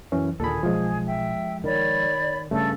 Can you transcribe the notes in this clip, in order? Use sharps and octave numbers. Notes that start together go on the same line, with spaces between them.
F#2 E3 C#4
D#2 A#2 D3 G#4 A4 B5
B1 F3 G#3
E5 G5
D#3 C#5 D5 B5
G2 C#3 A3 A4